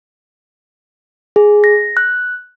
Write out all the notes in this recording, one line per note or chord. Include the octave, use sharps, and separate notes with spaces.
G#4
A#6
F#6